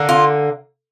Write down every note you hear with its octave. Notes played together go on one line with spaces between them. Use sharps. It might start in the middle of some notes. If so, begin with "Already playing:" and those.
Already playing: D3 A#3
F4